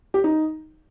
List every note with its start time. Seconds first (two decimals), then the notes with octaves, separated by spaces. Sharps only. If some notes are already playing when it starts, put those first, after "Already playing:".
0.14 G4
0.24 D#4